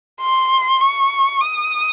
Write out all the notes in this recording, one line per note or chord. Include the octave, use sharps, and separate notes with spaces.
C6
C#6
D#6